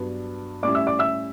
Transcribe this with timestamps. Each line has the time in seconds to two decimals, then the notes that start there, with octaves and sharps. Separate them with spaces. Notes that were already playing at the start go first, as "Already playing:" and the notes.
Already playing: G2 F#3 B3 D4
0.63 A2 G3 C#4 E4 D5 D6
0.75 E5 E6
0.87 D5 D6
0.99 E5 E6